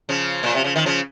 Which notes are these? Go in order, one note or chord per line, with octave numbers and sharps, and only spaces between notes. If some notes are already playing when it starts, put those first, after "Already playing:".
C#3 F3
A#2
C3
C#3
D#3
C#3 F3